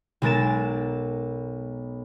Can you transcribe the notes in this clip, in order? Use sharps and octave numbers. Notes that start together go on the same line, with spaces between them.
B1 G#3 A#4 A6 E7